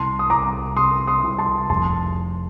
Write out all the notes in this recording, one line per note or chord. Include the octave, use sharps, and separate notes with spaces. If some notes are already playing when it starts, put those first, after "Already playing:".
Already playing: C2 A5 C6
D#6
C2 A#5 D6
C3 C6 D#6
C6 D#6
C2
A5 C6
F1 A5 C6